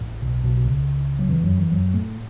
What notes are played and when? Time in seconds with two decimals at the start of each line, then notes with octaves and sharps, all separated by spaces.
0.01 A1 A2
0.22 B1 B2
0.44 B1 B2
0.57 B2
0.65 C#2 C#3
1.19 F#3
1.29 E2 E3
1.43 F#2 F#3
1.58 E2 E3
1.72 F#2 F#3
1.94 A2 A3